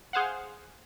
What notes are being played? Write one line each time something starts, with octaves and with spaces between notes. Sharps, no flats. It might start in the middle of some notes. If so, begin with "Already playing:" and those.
G#4 C5 F5 F#5